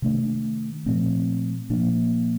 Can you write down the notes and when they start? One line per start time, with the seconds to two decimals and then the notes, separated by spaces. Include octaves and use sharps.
0.02 C3 D#3 A3 D4
0.86 A#2 F3 A3 C4
1.70 A#2 F3 A#3 D4